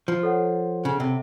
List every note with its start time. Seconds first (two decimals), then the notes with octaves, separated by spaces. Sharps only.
0.08 F3
0.23 A4 C#5 F#5
0.85 C#3
1.00 C3